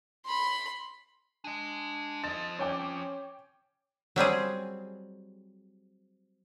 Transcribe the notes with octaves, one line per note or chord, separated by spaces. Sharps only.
B5 C6
D4 G#4 D#5
F3 C4 D#5 A6
C#4 C#5 G5 D6
F#3 G3 C4 G#4